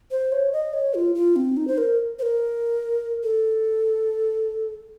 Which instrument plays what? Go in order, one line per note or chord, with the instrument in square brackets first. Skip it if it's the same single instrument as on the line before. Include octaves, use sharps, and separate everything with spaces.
[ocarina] C5
C#5
D#5
C#5
F4
F4
C4
D#4
C5
A#4
C5
A#4
A4